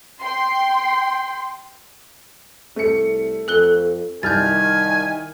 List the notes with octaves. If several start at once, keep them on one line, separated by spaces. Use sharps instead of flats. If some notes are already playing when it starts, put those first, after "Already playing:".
G5 C6
C2 A3 C#7
F2 A4 F#6 G7
C2 D#3 G#5 F6 G6 A6